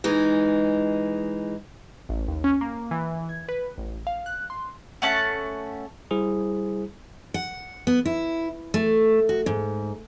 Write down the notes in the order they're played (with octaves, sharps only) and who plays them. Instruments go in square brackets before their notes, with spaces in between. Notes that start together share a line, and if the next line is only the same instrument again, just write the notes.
[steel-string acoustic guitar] E3 G#3 D#4
[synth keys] A1
D#2
C#4
A#3
E3
G#6
B4
A1
F5
F#6
C6
[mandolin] A3 C#4 F#5 A5
[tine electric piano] G3 E4 G#4 C5
[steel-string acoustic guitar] F#5
B3
E4
A3
F#4
G#2